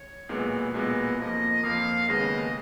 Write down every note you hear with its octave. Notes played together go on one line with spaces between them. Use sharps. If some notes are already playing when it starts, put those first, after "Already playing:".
Already playing: C#5
B1 A#2 G#3 B3
B1 A#2 G#3 B3 D#5
F2 F3 A#3 D#5
F2 F3 A#3 F5
D#2 C#3 G#3 B3 D#5